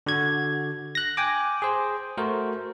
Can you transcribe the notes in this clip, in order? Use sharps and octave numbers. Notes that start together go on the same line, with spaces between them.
D3 F#4 G#6
F#6 A#6
G5 G#5 D6
G#4 C5
A3 F#4 A#4 C5